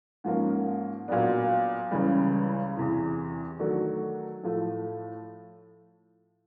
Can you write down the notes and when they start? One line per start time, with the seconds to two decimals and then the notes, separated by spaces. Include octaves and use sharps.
0.24 G#2 F3 A#3 C#4
1.08 A#2 F#3 B3 D4
1.91 C#2 C#3 E3 G3
2.76 E2 C3 E3
3.59 D#3 F#3 A3 D4 F#4
4.43 A2 F3 A3